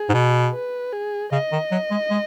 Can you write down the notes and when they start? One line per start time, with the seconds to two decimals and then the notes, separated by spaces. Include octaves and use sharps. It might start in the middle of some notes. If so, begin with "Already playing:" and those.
Already playing: G#4
0.09 G#2
0.14 B2
0.54 B4
0.92 G#4
1.32 C#3 D#5
1.52 D#3
1.71 F#3
1.91 G#3
2.11 G#3